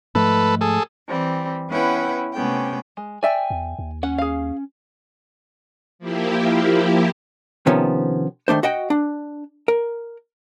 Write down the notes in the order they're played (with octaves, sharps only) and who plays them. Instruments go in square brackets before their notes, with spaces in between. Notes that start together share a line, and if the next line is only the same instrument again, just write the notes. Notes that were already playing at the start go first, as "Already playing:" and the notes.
[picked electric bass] G#2 F3 A3 [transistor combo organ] A4 B4
[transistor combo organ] G#4 A4
[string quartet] E3 G3 C4
B3 C#4 E4 B4 F#5 G5
C3 A3 B3 C#4 G5
[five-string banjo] G#3
[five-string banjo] D5 E5 G5 [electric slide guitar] G#5
[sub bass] E2
D#2
[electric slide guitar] C#4 [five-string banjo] F#5
[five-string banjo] G#4 F5
[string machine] F3 A#3 E4 G4
[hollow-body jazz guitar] C3 D#3 F3 B3 C#4
D#3 A3 D4 C5
F#4 D#5 F#5 G5
D4
A#4